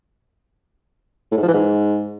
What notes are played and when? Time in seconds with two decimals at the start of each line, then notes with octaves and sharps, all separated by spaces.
1.32 A2
1.37 G#2
1.43 F3
1.48 E3
1.53 G#2